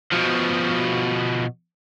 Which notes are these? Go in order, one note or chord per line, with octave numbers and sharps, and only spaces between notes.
B2 F3